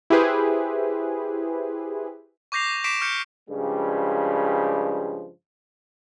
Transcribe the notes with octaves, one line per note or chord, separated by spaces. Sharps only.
E4 G4 G#4 B4 C5
C#6 D6 G6 A#6 C7 F7
C#6 D6 B6 C7 D7 E7
C#6 F6 G6 C#7
G2 C#3 F3 G3 G#3